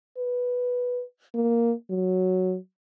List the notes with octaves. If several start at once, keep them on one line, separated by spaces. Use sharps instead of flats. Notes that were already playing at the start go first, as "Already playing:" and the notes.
B4
A#3
F#3